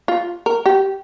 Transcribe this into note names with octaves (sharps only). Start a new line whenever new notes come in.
F4
A#4
G4